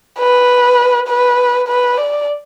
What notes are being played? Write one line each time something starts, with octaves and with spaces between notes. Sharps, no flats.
B4
B4
B4
D5